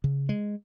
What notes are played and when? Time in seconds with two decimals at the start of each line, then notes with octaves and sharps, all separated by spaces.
0.04 C#3
0.29 G#3